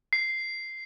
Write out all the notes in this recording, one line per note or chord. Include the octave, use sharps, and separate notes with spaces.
C7